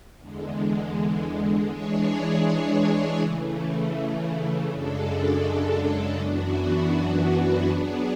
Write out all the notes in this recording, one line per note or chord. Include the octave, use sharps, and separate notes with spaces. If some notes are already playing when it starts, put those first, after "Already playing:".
E2 D3 G#3
E3 G#3 D4 G#4 C#5
C#3 E3 A3
F#2 C#3 G#3 D4 A4
F#2 E3 B3 D4 F#4
F#3 B3 D4 G#4